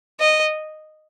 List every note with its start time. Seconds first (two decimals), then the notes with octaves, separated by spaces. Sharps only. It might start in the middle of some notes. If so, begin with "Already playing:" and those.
0.20 D#5